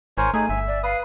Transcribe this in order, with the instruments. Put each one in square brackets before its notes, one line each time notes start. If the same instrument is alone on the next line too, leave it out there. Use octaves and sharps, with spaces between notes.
[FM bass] G#1 [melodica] A#4 C5 C#5 [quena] G#5
[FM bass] A3 [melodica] D#4 G#4 [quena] G#5
[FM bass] G1 [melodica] E5
[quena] D5
[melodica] B4 D#6 [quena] F5